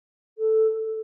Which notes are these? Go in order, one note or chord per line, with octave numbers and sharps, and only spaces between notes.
A4